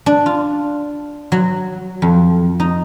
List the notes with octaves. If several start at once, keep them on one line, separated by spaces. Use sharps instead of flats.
D4
F4
F#3
F2
D#4